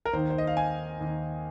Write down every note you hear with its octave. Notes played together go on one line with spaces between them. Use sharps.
A#4
D#2 D#3 C5
C5
D#5
F5
G#5
D#2 D#3